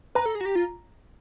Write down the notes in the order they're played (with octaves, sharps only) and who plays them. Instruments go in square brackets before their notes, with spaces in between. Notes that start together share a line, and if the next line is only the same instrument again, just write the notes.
[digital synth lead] B4 [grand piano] A#5
[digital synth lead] A4
G#4
F#4
G4
F4